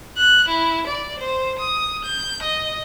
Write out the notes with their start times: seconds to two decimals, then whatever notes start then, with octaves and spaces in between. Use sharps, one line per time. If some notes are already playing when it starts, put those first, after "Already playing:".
0.18 F#6
0.48 E4
0.87 D5
1.19 C5
1.59 D#6
2.05 G6
2.43 D#5